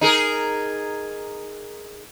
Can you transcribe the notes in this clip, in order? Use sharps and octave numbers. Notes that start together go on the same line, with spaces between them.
D#4 G#4 A#4